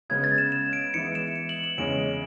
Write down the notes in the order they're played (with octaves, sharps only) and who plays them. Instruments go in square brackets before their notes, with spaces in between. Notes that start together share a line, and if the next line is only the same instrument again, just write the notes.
[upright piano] C#3 G#3 B3 [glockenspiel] G#6
[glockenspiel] A6
E7
E7
D7
[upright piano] E3 G#3 B3 E4 [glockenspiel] C#7
[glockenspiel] E7
E7
F#7
E7
[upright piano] E2 C#3 G#3 C#4 [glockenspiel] D7